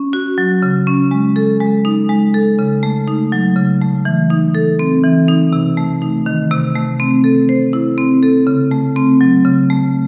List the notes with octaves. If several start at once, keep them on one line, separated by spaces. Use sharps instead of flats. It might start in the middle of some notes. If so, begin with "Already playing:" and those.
Already playing: C#4
F#4
F#3
C#3
C#4
G#3
A4
G#3
D#4
G#3
A4
C#3
A3
D#4
F#3
C#3
A3
E3
D#4
A4
C4
E3
D#4
C3
A3
D#4
D#3
C3
A3
C4
A4
C5
E4
C4
A4
C#3
A3
C4
F#3
C#3
A3